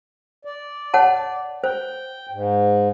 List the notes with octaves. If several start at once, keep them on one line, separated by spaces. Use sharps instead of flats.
D5
C#5 F#5 A5
C5 G5
G#2